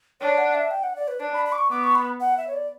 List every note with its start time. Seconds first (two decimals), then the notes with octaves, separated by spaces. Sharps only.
0.21 D4 C#5
0.38 F#5
0.55 E5
0.71 G5
0.83 F#5
0.96 D5
1.08 B4
1.20 D4 D5
1.34 B5
1.46 B5
1.52 D6
1.58 C#6
1.70 B3 D6
1.84 C#6
1.95 B5
2.20 F#5
2.37 E5
2.47 C#5
2.54 D5